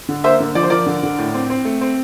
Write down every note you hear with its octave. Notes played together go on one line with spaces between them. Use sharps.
D3
A#3 C5 E5
D3
F3 D5
C5
F3 A#4 D5
D3
D3
A2
C4
C4
A3
C4